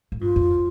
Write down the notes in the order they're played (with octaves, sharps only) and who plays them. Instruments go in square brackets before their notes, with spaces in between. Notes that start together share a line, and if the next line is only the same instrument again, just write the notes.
[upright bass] A2
[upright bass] G2 [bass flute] F4
[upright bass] F2